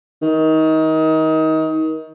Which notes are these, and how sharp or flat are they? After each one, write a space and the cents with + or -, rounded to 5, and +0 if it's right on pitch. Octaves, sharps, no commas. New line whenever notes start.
D#3 +25